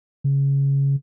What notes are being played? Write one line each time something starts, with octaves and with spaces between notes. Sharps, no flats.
C#3